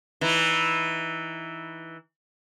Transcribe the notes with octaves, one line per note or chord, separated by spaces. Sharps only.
E3 D#4